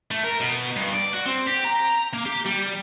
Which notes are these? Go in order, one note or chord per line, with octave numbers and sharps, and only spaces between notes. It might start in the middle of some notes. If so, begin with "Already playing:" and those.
A3
A#4
B2
G2
D5
F#4
C4
G4
A#5
A#3
G4
G3